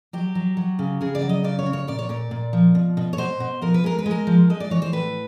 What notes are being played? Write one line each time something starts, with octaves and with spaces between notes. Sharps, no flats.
F#3 G4
F#3
F#3
C#3
C#3 G#4
D5
F#3
D#5
C#3 D5
C#5
C#3
C#5
A#2 D5
C#5
A#2 D5
A#2
F3
B2
B2
C#5
B2 C5
B2
F3 A#4
B4
G#3 A#4
B4
G#3
A#4
F3
G#3 D#5
D5
E3 C#5
C5
A2 B4